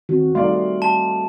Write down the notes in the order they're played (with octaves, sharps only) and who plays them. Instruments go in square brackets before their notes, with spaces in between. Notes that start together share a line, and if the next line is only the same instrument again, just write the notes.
[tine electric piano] D#3 C4 [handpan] F#4
[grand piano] D#3 D5 F5 [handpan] G3 A3 C4 [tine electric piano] C6
[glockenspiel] A5